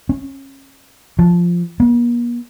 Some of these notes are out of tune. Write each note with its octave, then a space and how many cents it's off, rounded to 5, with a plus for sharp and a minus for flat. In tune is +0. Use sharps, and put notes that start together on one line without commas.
C#4 -25
F3 -5
A#3 +45